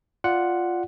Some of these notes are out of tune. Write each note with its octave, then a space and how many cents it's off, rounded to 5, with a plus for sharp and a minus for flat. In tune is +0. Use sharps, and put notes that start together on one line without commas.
F4 +0 D5 +0 F#5 +0